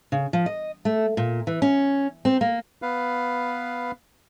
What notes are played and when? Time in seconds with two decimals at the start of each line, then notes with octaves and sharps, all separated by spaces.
0.12 C#3
0.33 F3
0.46 D#5
0.85 A3
1.17 A#2
1.47 E3
1.62 C#4
2.25 C4
2.41 A#3
2.82 B3 B4 F5